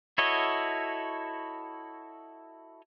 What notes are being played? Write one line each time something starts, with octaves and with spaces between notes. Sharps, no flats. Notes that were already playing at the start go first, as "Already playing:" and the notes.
E4 F#4 A4 C#5 D#5